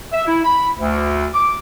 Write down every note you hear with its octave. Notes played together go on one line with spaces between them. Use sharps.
E5
E4
B5
D2
D6